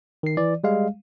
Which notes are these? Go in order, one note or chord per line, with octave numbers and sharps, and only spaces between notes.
D#3 C7
E3 D5
G3 G#3 F5